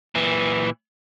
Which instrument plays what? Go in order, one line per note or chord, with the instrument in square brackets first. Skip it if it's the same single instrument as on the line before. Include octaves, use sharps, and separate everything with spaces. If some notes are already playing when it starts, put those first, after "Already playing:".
[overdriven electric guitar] A#2 E3